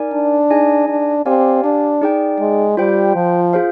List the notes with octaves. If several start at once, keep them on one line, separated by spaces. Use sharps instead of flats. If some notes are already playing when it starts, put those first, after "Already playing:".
Already playing: D#4 A#4 D5 G#5
D4
D#4 G#4 D#5 G#5
D4
C4 G4 D5 F5 G#5
D4
D#4 G#4 D5 G5
G#3
G3 F4 C5 G5
F3
F4 G#4 C5 F5